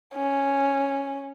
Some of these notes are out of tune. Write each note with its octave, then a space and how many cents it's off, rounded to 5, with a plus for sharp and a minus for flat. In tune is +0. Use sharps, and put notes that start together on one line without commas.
C#4 -5